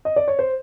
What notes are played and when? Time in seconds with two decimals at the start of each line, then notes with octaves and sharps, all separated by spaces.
0.05 D#5
0.16 D5
0.28 C#5
0.39 C5